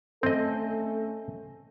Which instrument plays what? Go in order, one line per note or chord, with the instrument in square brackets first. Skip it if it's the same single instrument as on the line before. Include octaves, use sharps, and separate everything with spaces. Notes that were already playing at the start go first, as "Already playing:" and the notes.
[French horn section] A3 C#4 A4 [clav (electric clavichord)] C4 D#5